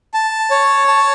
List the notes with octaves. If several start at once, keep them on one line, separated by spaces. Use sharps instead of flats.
A5
C#5
A5